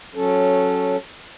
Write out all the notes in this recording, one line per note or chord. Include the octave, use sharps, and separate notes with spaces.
F#3 C#4 A4